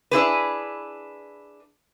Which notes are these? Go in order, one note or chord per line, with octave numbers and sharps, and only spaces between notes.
D4 E4 G#4 B4